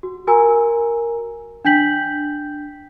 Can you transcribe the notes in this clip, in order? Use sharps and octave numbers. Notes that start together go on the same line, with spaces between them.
F#4
F#4 A#4 G#5 A#5 E6
D4 G5 G6 B6 F#7